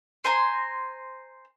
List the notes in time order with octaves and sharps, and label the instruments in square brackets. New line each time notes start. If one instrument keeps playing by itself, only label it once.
[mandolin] C5 G#5 A#5 C6